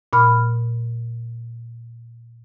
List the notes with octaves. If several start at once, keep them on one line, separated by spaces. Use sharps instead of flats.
A#2 B5 F6